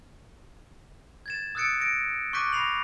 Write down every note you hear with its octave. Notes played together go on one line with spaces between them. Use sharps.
G#6 A6 E7
D#6 E6 F#6 A6 C#7 D7
A#6 D7
C#6 D6 F#6 G6 B6 D#7
B5 A#6 C7 F7 F#7